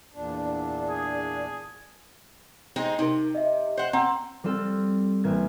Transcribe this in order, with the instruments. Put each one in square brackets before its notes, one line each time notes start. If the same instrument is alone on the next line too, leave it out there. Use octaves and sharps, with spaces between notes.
[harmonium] E2 A#2 D4
[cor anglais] G#4
[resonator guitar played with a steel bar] G#3 C4 D#4
[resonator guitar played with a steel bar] C3 [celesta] D#4 A#4
[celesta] D#5 E5
[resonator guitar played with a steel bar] C5 F#5
[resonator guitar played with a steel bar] C4 [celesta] F#5 A#5
[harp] G3 C4 F4 A4
A1 A#3 G#6